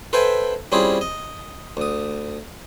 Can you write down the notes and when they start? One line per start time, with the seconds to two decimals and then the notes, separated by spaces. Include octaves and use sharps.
0.13 A4 B4 C5 E5 G5 G#5
0.72 G3 C4 C#4 E4 F4 G#4
1.01 D#5
1.77 D2 D#6